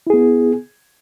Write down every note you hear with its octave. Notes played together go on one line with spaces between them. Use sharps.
B3 E4 G#4